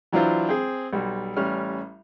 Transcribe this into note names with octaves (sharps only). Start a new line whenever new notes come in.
E3 F#3 D4 E4 F4 C5
C4 G#4
B1 G3
A1 G3 C#4 F6